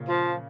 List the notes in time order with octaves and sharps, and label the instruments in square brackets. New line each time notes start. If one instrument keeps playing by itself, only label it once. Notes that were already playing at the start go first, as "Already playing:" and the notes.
Already playing: [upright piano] A#2 C#3
[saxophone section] F3